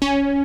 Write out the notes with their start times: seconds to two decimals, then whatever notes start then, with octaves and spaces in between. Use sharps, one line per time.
0.02 C#4